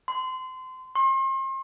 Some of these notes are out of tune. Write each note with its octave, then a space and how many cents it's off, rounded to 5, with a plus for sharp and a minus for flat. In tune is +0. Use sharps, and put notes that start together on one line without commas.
C6 -25
C6 +40